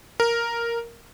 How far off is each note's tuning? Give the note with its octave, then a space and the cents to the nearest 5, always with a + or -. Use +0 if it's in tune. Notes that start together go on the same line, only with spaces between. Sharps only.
A#4 +0